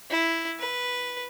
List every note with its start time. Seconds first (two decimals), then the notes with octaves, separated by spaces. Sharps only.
0.10 E4
0.60 B4